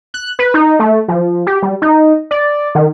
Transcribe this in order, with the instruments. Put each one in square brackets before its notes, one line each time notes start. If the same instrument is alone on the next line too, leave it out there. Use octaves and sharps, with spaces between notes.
[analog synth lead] F#6
B4
D#4
A3
F3
G4
G3
D#4
D5
D#3